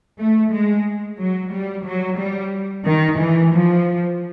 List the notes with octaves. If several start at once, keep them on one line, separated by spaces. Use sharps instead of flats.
A3
G#3
F#3
G3
F#3
G3
D#3
E3
F3